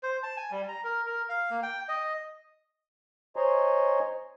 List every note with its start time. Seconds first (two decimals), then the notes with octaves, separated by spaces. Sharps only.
0.03 C5
0.23 A5
0.37 G#5
0.51 G3
0.68 A#5
0.84 A#4
1.07 A#4
1.29 F5
1.50 A#3
1.63 G5
1.89 D#5
3.36 C5 C#5 D#5 G#5 A#5 C6